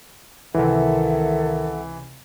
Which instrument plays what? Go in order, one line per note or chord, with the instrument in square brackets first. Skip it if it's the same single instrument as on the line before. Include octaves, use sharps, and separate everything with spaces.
[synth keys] C#2 C3 [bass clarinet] D#3 [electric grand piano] E3 [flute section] A4 E5 F#5